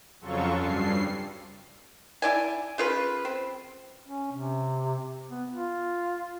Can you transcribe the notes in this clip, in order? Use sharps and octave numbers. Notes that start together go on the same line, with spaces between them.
F2 C#3 F#3 F4 A4 C#6
G2 C7
E4 D5 G#5
C#3 F4 B4
C4
C#4
C3
B3
F4